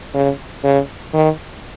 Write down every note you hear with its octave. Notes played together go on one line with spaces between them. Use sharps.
C#3
C#3
D#3